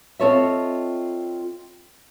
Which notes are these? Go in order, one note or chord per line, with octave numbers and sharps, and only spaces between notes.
C4 F4 A4 C#5 D#5 E5